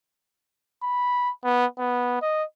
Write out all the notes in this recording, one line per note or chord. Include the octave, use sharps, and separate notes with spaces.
B5
B3
B3
D#5